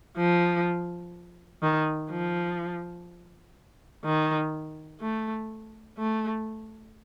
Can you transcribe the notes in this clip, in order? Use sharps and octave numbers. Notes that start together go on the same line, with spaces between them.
F3
D#3
F3
D#3
A3
A3